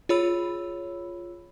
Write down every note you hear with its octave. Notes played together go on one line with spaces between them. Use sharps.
F4 G#4 C#5 B5 E6